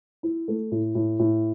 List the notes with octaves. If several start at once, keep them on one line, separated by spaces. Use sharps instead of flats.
E4
A3
A2
A2
A2